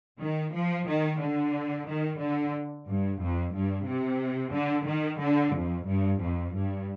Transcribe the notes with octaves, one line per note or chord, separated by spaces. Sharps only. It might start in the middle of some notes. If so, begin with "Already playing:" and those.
D#3
F3
D#3
D3
D#3
D3
G2
F2
G2
C3
D3
D#3
D3
F2
G2
F2
G2